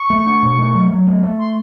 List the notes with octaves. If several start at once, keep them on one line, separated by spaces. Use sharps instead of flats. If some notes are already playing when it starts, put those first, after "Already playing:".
Already playing: C#6
A3
D4
B2
A3
F#3
F#3
A3
A3
C6